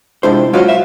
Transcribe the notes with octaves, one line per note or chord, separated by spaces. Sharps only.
C3 F3 G#3 D4 E4 C5
F#3 F4 B4 C5 D#5 F5
E5 F5